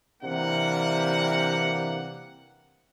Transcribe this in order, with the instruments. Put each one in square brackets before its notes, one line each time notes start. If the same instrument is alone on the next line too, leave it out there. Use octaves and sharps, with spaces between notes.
[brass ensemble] C3 E3 G3 A#3 D4 F#5